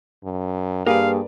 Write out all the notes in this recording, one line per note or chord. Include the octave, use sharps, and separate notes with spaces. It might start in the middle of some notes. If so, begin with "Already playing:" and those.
F#2
G2 A#3 G4 G#4 A#4 B4 D5 F5